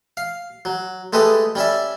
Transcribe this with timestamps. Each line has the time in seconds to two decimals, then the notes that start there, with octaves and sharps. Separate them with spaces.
0.17 F5
0.65 F#3
1.13 G#3 A3 G4 A4 B4 D#5
1.55 G3 C#4 D5 E5